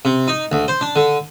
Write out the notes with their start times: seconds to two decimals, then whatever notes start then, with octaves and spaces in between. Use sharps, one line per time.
0.05 C3
0.28 D#4
0.52 D2
0.68 C5
0.81 D4
0.96 D3